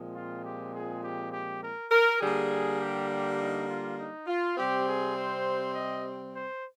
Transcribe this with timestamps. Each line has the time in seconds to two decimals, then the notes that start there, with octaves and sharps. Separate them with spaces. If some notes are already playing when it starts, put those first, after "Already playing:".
Already playing: A#2 F3 G#3 C4
0.14 F4
0.43 G4
0.73 G#4
1.02 G4
1.32 G4
1.62 A#4
1.91 A#4
2.21 D3 G3 A#3 G#4
2.80 G4
3.09 G4
3.39 D#4
3.68 F4
3.97 D#4
4.27 F4
4.57 C3 G3 C4 G4
4.87 G#4
5.16 C5
5.74 D#5
6.34 C5